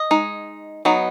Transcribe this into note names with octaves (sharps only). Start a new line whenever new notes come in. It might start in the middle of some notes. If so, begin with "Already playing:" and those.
Already playing: D#5
G#3 D#4
F#3 B3 D#4